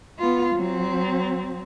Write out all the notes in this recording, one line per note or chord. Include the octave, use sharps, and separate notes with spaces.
B3 F4
F#3 C4